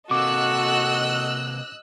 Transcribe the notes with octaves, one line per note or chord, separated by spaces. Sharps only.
C3 A#3 F#4 A4 D#5 D6 E6 F#6